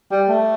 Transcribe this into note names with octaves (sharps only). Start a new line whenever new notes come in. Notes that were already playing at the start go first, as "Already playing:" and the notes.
G3
A3